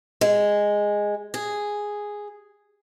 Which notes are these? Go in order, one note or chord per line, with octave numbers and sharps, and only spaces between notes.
G#3
G#4